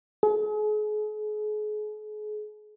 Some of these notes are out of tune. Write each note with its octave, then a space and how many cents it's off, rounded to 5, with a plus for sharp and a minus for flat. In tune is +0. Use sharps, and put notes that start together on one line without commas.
G#4 +40